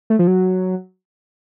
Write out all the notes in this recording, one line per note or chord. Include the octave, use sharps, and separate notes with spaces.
A3
F3
F#3